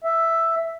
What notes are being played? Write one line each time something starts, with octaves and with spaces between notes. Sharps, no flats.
E5